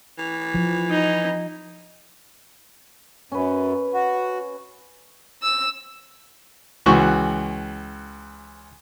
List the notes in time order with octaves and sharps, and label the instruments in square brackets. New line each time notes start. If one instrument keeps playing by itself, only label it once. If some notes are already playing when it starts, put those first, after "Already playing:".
[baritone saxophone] E3
[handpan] F3
[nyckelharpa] D#4
[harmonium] F#2 [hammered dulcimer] C#4 B4
[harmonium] F#4
[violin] E6
[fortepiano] C#2 E3 F#4 C#6